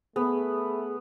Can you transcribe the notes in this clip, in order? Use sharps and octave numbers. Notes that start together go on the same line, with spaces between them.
A3 B3 G#4